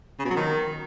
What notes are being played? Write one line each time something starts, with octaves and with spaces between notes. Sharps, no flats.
C#3
B2
F#3
D#3